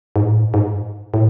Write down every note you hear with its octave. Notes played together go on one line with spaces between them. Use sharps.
G#2
A2
G#2
A2